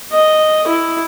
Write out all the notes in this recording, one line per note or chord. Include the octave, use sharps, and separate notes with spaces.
D#5
E4